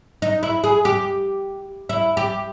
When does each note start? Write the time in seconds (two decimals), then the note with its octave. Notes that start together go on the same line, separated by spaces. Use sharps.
0.22 D#4
0.43 E4
0.64 G#4
0.85 G4
1.89 E4
2.17 G4